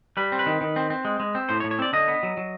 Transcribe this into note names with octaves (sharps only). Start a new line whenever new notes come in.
G3 B4
C4
B4
D#3
D#3
C4
C4
G#3
G#3
C4
A2 C5
C#5
A2
C#5
C4 D5
D3 D#5
B3
F#3
F#3